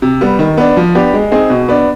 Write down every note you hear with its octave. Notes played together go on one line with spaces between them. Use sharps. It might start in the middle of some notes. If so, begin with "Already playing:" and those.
C3
G3 B3
D#3
B3 D4
F3
B3 D4 G4
G#3
C4 D#4 G#4
B2
B3 D4